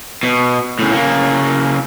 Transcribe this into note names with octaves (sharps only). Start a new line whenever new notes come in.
B2
A2 C#3
C#3 A#3